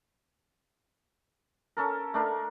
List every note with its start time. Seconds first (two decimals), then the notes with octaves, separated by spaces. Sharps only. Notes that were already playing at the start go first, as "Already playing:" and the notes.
1.77 C#4 A4 A#4
2.14 A3 D4 A#4